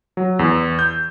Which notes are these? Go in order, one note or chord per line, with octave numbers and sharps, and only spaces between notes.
F#3
E2
G6